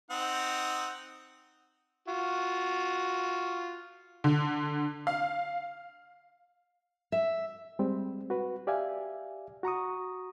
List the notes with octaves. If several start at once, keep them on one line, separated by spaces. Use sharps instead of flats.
C4 D#4 F#5
F4 F#4
D3
F5
E5
G3 G#3 C4
F#4 B4
G4 D5 E5 F5 G#5
F#4 A#5 C#6 D#6